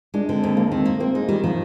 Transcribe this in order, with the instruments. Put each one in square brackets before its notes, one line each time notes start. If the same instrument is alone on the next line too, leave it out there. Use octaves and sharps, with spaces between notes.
[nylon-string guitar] G#3 [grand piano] D4
[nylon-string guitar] D3 [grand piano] C4
[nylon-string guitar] D#2 [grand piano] C4
[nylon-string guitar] G#3 [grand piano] A#3
[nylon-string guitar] D#3 [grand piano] C4
[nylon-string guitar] A#3
[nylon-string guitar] A#3 [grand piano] C4
[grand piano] G#3 [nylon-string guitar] D#4
[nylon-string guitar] D#3 [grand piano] G3
[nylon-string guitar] D#3 [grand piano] F3